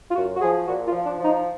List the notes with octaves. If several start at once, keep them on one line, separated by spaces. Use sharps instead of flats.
F4
F#2 F#4
F#4
F3 G#4
A#2 F#4
F4
F3
D4
F3
D#4